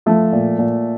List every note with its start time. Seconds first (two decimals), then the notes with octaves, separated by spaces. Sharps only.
0.06 F3 A3
0.32 A#2
0.59 A#2